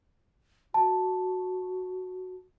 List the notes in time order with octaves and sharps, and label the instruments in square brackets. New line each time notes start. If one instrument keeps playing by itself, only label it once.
[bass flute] F#4 [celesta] A5